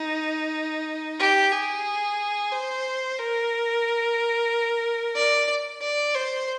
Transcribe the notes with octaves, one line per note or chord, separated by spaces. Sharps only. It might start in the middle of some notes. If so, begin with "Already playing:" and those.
Already playing: D#4
G4
G#4
C5
A#4
D5
D5
C5